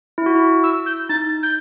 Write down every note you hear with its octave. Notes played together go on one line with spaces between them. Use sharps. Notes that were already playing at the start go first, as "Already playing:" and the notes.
E4
F#4
E4
E6
G6
D#4 A6
G6